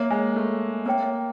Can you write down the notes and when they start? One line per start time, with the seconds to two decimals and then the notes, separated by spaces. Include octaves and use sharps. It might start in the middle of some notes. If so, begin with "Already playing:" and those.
Already playing: A#3 A#4 C#5 E5
0.11 G#3
0.36 A3
0.86 A#3 A#4 C#5 E5 G5